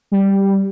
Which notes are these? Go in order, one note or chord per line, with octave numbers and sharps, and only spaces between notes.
G3